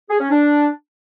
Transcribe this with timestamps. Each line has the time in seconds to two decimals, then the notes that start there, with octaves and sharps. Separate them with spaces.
0.09 G#4
0.20 C#4
0.31 D4